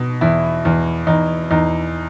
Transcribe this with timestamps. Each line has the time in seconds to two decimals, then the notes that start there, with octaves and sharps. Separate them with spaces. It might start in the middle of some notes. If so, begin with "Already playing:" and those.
Already playing: B2
0.21 E2 E4
0.65 E2
1.07 E2 D#4
1.51 E2 D#4